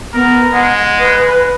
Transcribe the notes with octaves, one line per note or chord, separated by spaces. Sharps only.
B3 A#4
G#3 F#5
B4